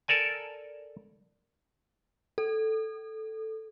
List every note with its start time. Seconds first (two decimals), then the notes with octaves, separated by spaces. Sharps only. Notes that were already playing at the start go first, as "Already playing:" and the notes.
0.08 A4 A#4 D5 G#5
2.38 A4